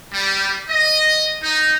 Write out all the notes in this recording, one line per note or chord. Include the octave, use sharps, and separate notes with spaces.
G3
D#5
D#4